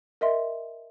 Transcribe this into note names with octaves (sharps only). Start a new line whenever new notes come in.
A#4 D#5 E5 C6